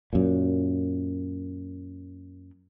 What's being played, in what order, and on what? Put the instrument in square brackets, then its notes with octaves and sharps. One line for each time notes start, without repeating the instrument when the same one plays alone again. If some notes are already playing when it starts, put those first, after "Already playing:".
[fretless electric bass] F#2 A#2